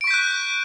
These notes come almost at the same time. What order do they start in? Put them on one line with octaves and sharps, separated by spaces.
D7 C#6 B6 G6 F#6